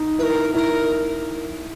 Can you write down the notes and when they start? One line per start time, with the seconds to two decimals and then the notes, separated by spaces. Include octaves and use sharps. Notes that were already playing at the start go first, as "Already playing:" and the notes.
Already playing: D#4
0.19 E4 B4
0.23 A#4
0.54 E4 A#4